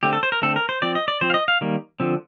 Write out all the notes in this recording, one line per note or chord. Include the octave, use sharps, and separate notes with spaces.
D3 A3 C4 G4
A4
C5
A#4
D3 A3 C4 A4
A#4
C5
F3 C4 D5
D#5
D5
F3 C4 C5
F5
D#5
F5
D#3 G3 A#3
D3 F3 C4